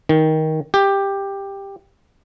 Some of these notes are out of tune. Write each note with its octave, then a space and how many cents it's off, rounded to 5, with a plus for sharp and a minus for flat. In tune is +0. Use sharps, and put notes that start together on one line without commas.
D#3 +15
G4 +10